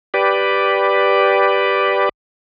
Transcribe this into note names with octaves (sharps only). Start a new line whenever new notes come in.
G4 B4 D5